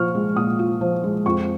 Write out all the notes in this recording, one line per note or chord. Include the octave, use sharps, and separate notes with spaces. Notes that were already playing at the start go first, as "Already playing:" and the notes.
Already playing: A#2 F3 F4 C#6 F6
G#3
A#2 D#6
F4
F3
G#3
F2 C#6